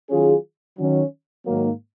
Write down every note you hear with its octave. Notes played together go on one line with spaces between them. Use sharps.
D#3 F#3 C#4 F4 G#4
D#3 F#3 C#4
G#2 D#3 F#3 A#3